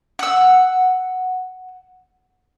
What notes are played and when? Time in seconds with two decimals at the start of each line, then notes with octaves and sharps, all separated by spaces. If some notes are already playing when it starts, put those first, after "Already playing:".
0.19 F#5 E6